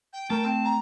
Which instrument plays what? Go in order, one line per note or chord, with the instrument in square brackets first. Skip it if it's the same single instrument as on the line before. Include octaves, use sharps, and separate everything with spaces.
[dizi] G5
[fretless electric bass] A3 [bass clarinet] A#4 [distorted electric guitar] A5
[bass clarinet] C4
[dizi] A#5